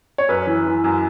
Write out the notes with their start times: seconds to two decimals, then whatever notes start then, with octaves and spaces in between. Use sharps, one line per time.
0.18 C#5
0.29 F#2 B4
0.47 E3
0.66 E3
0.84 F#2